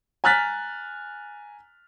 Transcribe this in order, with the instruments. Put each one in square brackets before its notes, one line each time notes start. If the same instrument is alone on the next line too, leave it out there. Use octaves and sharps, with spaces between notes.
[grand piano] G#5 A#5 F6 F#6 A6 B6